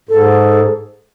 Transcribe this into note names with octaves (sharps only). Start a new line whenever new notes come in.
G#2 A4